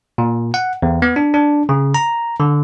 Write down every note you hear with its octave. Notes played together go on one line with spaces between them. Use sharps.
A#2
F#5
E2
B3
D4
D4
C#3
A#5
D3